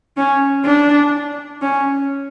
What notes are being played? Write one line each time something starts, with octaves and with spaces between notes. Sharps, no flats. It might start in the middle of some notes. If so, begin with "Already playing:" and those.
C#4
D4
C#4